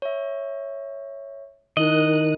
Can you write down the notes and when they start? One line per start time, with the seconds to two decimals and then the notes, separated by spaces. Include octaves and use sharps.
0.02 C#5 E5
1.77 D#3 D#4 E4 A#4 D#5 F#6